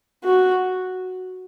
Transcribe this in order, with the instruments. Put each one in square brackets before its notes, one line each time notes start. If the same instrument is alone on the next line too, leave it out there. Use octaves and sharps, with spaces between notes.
[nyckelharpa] F#4